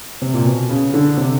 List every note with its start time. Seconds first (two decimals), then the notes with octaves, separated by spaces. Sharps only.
0.22 C3
0.34 A#2
0.45 B2
0.69 C#3
0.94 D3
1.17 C3